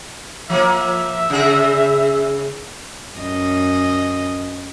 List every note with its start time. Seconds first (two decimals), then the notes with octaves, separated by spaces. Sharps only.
0.50 F3 A#3 E5
1.30 C#3 G#4
3.17 F#2 D#5